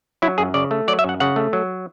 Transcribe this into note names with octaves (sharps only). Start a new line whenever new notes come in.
F#3 E4
F#2 G#4
C#3 D5
A3
F#3 D5
E5
F#2 F#5
C#3 F#5
A3
F#3